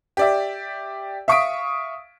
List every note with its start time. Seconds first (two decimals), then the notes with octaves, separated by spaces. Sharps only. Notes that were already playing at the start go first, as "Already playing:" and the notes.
0.17 G4 D5 E5
1.28 E5 F5 C#6 D#6 B6 D7